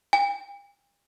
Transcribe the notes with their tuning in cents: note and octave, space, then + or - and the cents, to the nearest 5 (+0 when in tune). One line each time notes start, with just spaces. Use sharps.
G5 +45